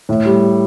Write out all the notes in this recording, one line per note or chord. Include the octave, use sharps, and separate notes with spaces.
A2
G3